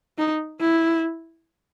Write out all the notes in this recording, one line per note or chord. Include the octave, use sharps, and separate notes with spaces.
D#4
E4